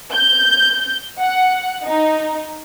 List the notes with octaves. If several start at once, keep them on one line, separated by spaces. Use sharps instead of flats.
G6
F#5
D#4